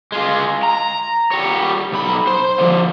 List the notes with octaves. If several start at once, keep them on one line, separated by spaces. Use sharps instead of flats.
G#3 F4
A#5
G3 C#5
B1 B5
C5
D3 F3